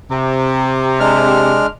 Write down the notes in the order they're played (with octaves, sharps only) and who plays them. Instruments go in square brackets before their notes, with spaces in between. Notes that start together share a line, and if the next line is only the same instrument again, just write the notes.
[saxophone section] C3
[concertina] G#3 D4 F6